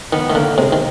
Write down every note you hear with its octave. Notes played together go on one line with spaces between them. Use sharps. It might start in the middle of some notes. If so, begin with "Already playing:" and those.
D#3 B3
D#3 A3
D3 A#3
C3 G#3
D#3